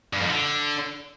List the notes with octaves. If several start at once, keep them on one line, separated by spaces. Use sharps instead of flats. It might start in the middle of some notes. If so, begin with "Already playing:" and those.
G2
F2
D3